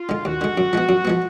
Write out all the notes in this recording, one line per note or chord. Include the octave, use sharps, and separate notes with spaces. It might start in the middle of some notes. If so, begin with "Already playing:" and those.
Already playing: F4
D3 G#3
D#2 F#4
D3 G#3
F#2
F3 G#3 B3
F#2
F3 G#3 B3